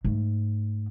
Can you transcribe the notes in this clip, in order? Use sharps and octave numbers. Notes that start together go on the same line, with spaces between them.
G#2 A3